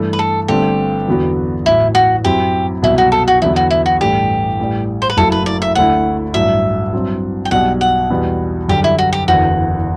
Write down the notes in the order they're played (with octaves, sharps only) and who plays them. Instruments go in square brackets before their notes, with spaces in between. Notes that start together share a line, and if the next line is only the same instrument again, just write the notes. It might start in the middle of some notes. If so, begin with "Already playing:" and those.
Already playing: [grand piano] G2 E3 A3
[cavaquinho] B4
A4
[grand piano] G1 G2 D3 A3 C4 [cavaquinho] G4
[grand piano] E2 D3 F#3 B3 F#4
[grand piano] A1 A2 F#3 [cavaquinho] E4
[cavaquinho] F#4
[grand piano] F#2 F#3 C4 E4 [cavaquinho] G4
[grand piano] C2 B2 F#3 [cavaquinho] E4
[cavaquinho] F#4
A4
F#4
[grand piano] E2 D3 F#3 B3 [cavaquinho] E4
[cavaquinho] F#4
E4
F#4
[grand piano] A1 G2 E3 A3 D4 [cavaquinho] G4
[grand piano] A1 A2 G3
[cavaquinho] C5
B4
[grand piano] F#1 F#2 F#3 A3 E4 [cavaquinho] A4
[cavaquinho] B4
D5
E5
[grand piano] D2 D3 A3 E4 [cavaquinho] F#5
[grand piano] A1 G2 F#3 [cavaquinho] E5
[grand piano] G2 F#3 C4
[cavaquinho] G5
[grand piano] B1 B2 G3 [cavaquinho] F#5
[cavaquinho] F#5
[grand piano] E2 B2 G3 B3
[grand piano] F#2 D3 G3 [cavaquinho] G4
[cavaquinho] E4
F#4
G4
[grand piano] F#1 E2 D3 [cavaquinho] F#4